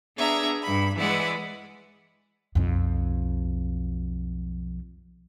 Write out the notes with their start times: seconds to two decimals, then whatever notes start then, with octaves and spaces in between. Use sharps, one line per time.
0.17 B3 D4 G#4 E5 A#5
0.63 G2 B5
0.96 E3 G#3 B4 D5 E5 F#5
2.55 B1 F2